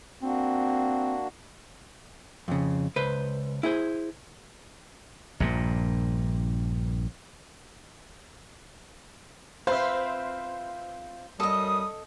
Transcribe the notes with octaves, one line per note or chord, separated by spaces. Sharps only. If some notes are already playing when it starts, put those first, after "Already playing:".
A#3 C4 D4 F#4
F2 C#3
C#2 B4 C5
E4 G#4 C5
A#1 G2 A#2
C4 F4 B4 C5 E5 F5
F#2 G3 A4 D#5 D#6